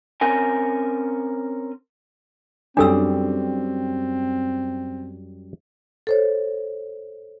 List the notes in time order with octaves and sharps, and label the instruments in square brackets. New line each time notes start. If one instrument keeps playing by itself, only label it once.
[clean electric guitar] C4 C#4 A#4 G#5
[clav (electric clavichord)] F#2 G3 D5 [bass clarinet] C4 [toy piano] D4 A4 E6
[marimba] A4 C5 C#5